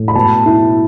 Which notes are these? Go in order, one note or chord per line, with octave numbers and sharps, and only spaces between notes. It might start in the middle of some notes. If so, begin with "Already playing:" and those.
Already playing: A2
B5
B2 A5
E4